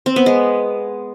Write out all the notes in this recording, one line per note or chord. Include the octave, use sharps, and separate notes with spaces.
C4
B3
G#3